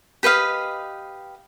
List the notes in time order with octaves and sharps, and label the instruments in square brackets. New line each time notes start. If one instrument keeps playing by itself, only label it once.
[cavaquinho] G4 B4 D#5 F5